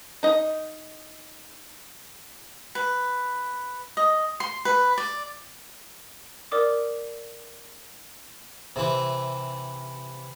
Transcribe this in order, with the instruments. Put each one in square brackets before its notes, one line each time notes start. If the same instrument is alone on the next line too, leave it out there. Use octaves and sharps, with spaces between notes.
[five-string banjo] D#4 D#5
[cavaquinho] B4
D#5
C6
B4
D5
[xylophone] A#4 D5 D6 D#6
[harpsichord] C3 E3